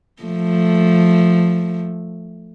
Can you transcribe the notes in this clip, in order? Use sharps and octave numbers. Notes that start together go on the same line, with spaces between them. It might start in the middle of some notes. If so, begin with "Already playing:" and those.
F3 A3